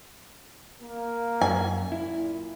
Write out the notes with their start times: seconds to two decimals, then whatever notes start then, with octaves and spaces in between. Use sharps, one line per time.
0.81 A#3
1.41 F#2 G#5
1.92 A#2 E4